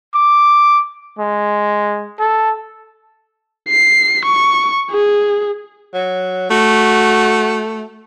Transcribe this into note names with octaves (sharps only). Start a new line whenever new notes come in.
D6
G#3
A4
C7
C#6
G#4
F#3
A3 F#4